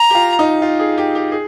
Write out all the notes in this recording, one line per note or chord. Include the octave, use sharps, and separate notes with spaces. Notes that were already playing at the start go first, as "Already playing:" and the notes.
Already playing: A#5
G4
F4
D#4
F4
G#4
G4
G4
G#4